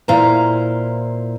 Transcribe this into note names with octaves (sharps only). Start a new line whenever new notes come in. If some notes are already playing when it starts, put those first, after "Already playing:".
A#2 E4 C5 F5 A#5